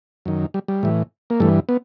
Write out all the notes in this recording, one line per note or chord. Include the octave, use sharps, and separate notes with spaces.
F#2 D#3
G3
G3
A2 E3
A#3
G2 E3 A3
B3